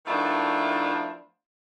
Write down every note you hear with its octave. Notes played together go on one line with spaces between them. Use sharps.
D#3 F3 A3 B3 D4 E4